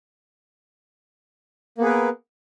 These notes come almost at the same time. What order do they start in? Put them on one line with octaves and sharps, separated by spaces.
A#3 B3 G#4 B4 A#4